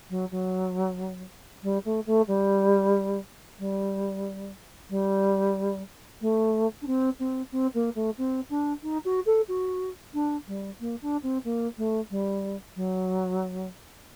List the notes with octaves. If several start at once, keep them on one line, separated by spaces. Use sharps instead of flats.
F#3
F#3
G3
A3
A3
G3
G3
G3
A3
D4
C4
C4
C4
A#3
A3
C4
D4
D#4
F#4
A4
F#4
D4
G3
A#3
D4
C4
A#3
A3
G3
F#3